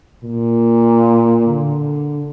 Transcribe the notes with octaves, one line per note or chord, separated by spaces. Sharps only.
A#2
D3